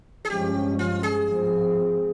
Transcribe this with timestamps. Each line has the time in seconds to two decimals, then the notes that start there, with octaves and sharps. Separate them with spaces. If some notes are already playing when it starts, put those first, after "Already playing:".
0.25 G#4
0.30 G2 F3 G#3 C#4 G4
0.79 F4
1.03 G#4
1.27 G#2 F3 C4